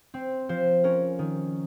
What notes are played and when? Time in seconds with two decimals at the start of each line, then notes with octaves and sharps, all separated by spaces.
0.14 C4
0.49 F3 C5
0.84 C#4 A#4
1.19 D#3